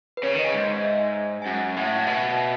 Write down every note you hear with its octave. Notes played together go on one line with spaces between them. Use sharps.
B4
C#3 C#5
D#3
D#5
C#3
G#2
D#5
E5
G#5
G#5
F#2 F#5
A2 F#5
E5
F#5
B2 E5
E5